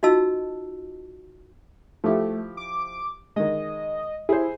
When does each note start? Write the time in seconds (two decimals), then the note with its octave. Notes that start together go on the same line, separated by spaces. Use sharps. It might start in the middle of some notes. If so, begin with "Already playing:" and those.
0.03 D#4 F4 F#4 D#5 A5 E6
2.04 F3 A3 E4 G4
2.57 D6
3.36 D#3 G#3 D#5
4.29 E4 G#4 C5